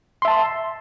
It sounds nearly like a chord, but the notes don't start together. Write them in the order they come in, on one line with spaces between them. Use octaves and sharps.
C6 E5 A5